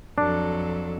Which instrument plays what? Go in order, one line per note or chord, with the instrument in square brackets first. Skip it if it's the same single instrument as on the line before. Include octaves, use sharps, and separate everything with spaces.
[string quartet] F2 F#3 A4 [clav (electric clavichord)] D4